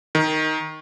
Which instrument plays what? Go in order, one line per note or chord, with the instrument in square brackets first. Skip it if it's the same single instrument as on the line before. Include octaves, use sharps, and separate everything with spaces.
[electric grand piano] D#3